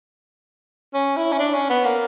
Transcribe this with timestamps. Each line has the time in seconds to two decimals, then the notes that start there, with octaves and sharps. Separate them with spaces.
0.94 C#4
1.17 E4
1.32 C#4
1.39 D4
1.54 C#4
1.70 B3
1.85 A#3